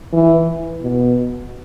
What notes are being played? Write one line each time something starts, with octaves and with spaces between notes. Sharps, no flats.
E3
B2